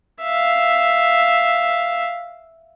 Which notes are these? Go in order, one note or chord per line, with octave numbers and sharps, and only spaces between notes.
E5 F5